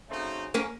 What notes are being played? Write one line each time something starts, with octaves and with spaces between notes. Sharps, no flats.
C#3 A3 C4 D#4 F#4
A#3 C#4